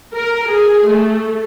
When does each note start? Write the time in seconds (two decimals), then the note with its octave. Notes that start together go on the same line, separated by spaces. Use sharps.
0.15 A#4
0.50 G#4
0.88 A3